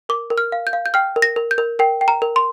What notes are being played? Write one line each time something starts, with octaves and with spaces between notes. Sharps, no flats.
A#4 D6
A#4
F6
F5
G6
F5
G6
G5 F6
A#4
A#6
A#4
G6
A#4
A#4 G5
G5
A#5
A#4
C6